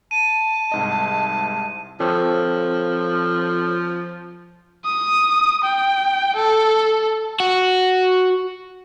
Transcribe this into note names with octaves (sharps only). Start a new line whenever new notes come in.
A5 D#7
C2 G#2 D#5
F3 C4 A4 C#5
D#6
G5
A4
F#4